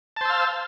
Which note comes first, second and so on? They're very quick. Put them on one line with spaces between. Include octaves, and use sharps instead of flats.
A5 C5 E6 F5